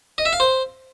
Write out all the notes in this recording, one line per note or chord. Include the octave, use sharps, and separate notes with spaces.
D#5
E5
F5
C5